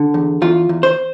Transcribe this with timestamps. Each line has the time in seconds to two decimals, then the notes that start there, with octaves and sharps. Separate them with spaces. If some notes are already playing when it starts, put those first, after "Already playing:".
Already playing: D3
0.14 E2
0.42 E2 F4
0.69 E2
0.83 C5